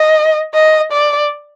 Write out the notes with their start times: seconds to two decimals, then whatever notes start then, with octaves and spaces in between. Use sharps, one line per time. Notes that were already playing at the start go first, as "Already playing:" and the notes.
Already playing: D#5
0.55 D#5
0.92 D5